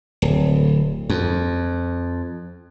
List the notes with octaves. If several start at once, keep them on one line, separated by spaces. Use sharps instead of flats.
D1
F2